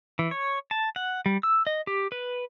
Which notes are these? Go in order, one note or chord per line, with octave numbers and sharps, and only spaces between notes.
E3
C#5
A5
F#5
G3
E6
D#5
G4
B4